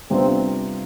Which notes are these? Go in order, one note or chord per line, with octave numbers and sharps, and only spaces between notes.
C3 G3 B3 C4 D4 F4